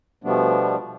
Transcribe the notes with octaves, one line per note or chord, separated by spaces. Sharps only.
B2 F3 G3 A3 B3 D4